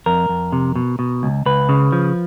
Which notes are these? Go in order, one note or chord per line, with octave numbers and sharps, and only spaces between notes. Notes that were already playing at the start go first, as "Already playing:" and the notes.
F2 A#4
F2
C3
B2
B2
C#2
C#2 B4
C#3
F3